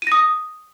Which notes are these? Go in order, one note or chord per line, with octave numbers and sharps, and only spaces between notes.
D#6 A#6 D#7